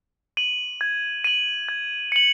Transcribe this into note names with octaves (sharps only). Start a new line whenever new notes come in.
D#7 F#7
G#6
D#7 F#7
G#6
C#7 F#7